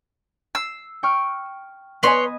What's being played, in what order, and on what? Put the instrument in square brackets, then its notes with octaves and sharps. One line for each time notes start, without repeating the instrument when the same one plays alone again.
[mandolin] E6 [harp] C7
[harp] G5 C#6 F6
[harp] B3 D#5 G#5 [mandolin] B4 C#5 C6